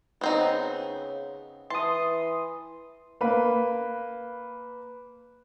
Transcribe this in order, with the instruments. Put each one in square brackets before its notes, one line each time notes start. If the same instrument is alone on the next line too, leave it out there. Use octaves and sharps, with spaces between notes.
[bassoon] C#3 [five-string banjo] B3 C4 D#4
[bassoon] E3 [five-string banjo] A5 [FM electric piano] C6 D#6
[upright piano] A#3 B4